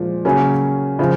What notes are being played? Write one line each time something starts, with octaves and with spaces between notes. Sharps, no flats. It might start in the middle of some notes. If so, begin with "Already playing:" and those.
Already playing: A#2 F3 G#3
C#3 F#3 A#3 C#4
C#3 F3